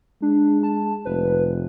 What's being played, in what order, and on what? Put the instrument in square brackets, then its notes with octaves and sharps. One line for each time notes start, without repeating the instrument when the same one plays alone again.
[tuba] G#3 [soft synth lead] D4
[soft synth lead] A5
[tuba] F1 [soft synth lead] B4